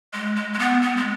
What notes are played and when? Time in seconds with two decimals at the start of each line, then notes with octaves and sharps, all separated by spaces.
0.13 G#3
0.36 G#3
0.53 G#3
0.59 B3
0.82 B3
0.97 G#3